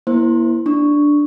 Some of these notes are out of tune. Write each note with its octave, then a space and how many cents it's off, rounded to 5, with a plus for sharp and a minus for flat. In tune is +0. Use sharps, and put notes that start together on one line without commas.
A#3 +35 E4 +0 C5 +0
D4 +0 C#6 +5